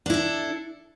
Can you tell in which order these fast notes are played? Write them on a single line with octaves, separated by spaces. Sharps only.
D4 E4 A4